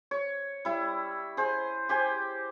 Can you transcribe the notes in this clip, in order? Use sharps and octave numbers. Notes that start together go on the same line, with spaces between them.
C#5
G3 E4
G#4 C5
G4 C5 G#5